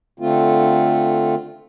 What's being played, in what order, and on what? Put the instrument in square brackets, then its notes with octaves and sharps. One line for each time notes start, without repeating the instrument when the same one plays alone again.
[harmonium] D3 A3 C4 F4